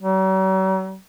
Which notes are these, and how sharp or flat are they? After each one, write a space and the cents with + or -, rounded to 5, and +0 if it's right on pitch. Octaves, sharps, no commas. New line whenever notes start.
F#3 +45